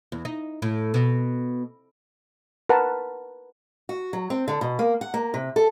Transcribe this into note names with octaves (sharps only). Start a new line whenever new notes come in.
E2
D#4
A2
B2
A#4 B4 F#5 A5
F#4
F#3
C4
D3
B2
A#3
F#5
A#3
C3
A4